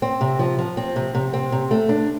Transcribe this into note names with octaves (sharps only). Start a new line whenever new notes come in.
C4
C3
F3
F3
C4
C3
C3
C4
C3
A3
D4